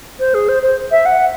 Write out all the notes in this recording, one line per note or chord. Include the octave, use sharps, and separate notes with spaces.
C5
G#4
C5
C5
E5
F#5